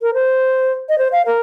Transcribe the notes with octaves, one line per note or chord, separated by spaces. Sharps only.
A#4
C5
D#5
C5
F5
A#4